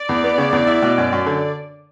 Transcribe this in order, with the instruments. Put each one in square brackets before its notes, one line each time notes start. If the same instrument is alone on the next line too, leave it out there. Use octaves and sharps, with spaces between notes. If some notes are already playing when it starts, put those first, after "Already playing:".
Already playing: [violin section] D5
[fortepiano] E2
B3
C#3
E2
E4
B2
F#2
F#2
D3